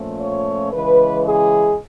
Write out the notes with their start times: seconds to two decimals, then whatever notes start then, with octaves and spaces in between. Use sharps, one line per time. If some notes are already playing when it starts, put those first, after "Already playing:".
Already playing: A#2 F3 A3 C#4
0.19 C#5
0.73 C#3 E3 G#3 B4
1.26 G#4